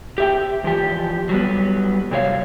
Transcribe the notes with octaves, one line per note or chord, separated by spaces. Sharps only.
G4 E5 G5
E2 F3 G4
F#3 G3 B3
G2 C3 F#3 C#5 F5